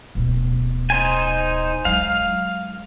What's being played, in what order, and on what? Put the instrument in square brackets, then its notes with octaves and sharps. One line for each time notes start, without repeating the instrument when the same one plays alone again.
[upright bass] D1 B2
[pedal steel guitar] D#4 C5 G#5
[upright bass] F#3 G#3 [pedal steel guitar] F5